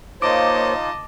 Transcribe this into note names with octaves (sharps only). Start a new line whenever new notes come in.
A#3 D#4 F4 C5 C#5 D#5 A5 D6